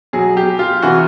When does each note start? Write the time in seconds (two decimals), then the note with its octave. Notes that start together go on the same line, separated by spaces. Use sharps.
0.13 B2 F#3 G#4
0.37 G4
0.59 F4
0.82 C3 E3 F#4